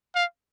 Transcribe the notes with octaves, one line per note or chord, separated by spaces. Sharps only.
F5